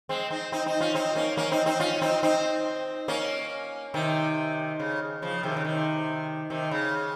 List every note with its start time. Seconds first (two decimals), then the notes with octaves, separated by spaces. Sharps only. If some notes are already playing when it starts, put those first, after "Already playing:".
0.09 G#3 C4
0.31 C4 D#4
0.52 C4 D#4
0.66 C4 D#4
0.81 C#4 F4
0.94 C4 D#4
1.16 A#3 C#4
1.37 A#3 C#4
1.51 C4 D#4
1.66 C4 D#4
1.80 C#4 F4
2.02 C4 D#4
2.23 C4 D#4
3.08 A#3 C#4
3.94 C3 D#3
4.80 C#3
5.22 C#3 F3
5.43 C3 D#3
5.57 C#3
5.65 C3 D#3
6.50 C3 D#3
6.71 C#3